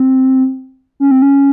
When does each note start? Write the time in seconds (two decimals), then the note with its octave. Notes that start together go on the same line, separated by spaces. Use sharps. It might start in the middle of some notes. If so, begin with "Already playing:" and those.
Already playing: C4
1.00 C#4
1.11 C4
1.22 C#4